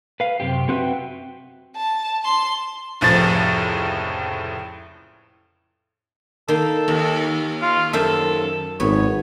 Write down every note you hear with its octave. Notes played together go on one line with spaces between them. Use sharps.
B4 F5
F#2 C3 C4 G4
A3 C4 F#4 B4 E5 G5
A5
A5 C6
F1 C#2 A2 F3 A6
D#3 A#3 A4 C6
D#2
F4
F#2 A4 C5 E5
G#1 B3 C#5